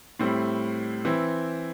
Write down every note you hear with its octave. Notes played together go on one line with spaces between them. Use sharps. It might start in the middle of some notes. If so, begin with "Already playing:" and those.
A2 G3 C4 E4
E3 C4 E4